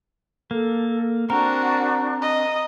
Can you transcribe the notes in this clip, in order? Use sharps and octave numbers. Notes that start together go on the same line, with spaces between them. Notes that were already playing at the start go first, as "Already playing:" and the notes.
A#3 A4
C4 D4 F#4 A#4 A#5
D#5